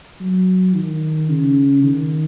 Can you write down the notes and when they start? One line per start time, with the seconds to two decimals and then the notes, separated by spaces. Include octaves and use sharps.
0.20 F#3
0.75 D#3
1.29 C#3
1.83 D#3